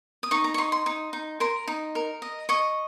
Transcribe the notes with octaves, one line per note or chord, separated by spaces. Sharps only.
D#6
D#4 C#6
A#5
C#6
D#4 C6
C6
D#4
D#4
A#4 C6
D#4
A#4
D#5
D#5 C#6